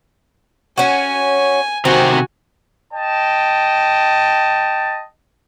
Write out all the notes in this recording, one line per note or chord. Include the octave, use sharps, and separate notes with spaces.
C#4 F#4 G#5
C3 D#3 C4 F#4 G#5
D#5 G5 A5